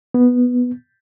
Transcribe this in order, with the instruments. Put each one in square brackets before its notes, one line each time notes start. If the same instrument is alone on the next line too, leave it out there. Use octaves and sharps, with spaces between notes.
[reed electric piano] B3